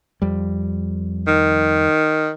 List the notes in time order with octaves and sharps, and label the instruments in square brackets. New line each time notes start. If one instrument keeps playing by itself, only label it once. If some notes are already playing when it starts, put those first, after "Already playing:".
[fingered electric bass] F2 G3
[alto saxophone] D#3